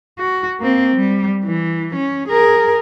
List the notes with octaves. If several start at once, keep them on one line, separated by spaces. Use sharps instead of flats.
F#4
A#3 C4
G3
E3
C#4
G#4 A#4